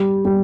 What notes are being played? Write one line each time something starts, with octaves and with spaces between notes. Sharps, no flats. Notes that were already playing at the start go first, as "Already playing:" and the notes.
Already playing: G3
G3